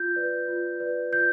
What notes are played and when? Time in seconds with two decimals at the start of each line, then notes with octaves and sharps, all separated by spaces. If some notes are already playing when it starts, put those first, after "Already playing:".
Already playing: F4 G6
0.16 B4 D5
0.48 F4
0.80 B4 D5
1.12 F4 G6